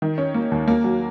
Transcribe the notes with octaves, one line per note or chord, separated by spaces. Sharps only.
D#3
C#4
A#3
D#2
A#3
F#3